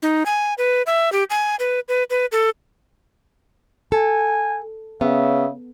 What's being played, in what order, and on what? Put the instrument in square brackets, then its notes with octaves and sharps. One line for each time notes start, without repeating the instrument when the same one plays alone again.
[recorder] D#4
G#5
B4
E5
G4
G#5
B4
B4
B4
A4
[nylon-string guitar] A4 [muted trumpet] G#5
[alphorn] C#3 [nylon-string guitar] B3 [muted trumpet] E5